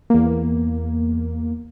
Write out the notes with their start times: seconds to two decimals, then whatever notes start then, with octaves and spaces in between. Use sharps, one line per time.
0.10 E2 A#3